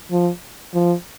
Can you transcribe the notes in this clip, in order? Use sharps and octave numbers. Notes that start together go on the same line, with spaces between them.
F3
F3